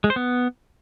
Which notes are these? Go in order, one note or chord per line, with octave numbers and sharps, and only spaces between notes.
G#3
C5
B3